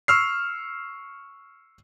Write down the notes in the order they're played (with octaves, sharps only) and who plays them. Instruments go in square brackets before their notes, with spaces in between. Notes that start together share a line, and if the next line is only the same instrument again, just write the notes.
[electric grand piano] C#6 E6 F6 C7